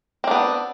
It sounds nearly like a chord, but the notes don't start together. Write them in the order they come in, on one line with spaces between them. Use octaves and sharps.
C4 D4 B3